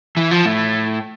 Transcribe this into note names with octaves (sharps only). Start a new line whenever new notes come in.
E3
F3
A2